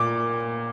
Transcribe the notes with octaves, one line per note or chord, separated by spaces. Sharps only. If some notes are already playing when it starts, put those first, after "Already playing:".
Already playing: A#2 D6